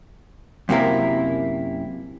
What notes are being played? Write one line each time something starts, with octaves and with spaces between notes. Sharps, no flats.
F#2 C3 A#3 E4 A#4